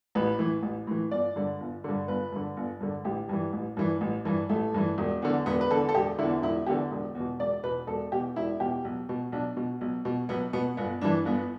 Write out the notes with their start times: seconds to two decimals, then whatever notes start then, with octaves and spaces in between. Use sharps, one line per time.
0.15 A1 B4
0.39 A2 E3
0.63 A1
0.87 A2 E3
1.11 G1 D5
1.36 G2 D3
1.60 G1
1.84 G2 D3
2.08 G1 B4
2.32 G2 D3
2.57 G1
2.81 G2 D3
3.05 A1 G4
3.29 G2 E3
3.53 A1
3.77 G2 E3
4.01 A1
4.25 G2 E3
4.49 A1 A3
4.74 G2 E3
4.98 E1
5.22 E2 D3
5.46 E1 B3
5.61 B4
5.70 E2 D3 A4
5.89 A4
5.94 E1 G4
6.18 D3 E4
6.23 E2
6.43 E1 E4
6.66 E2 D3 G4
6.91 E1
7.15 E2
7.20 B2
7.39 E1 D5
7.63 E2 B2 B4
7.87 E1 A4
8.12 E2 B2 G4
8.36 E1 E4
8.60 E2 B2 G4
8.85 B1
9.09 B2
9.32 B1 D4
9.57 B2
9.81 B1
10.05 B2
10.29 B1 B3
10.53 B2 B3
10.77 G1 B3
11.01 G2 E3 D4
11.25 G1 B3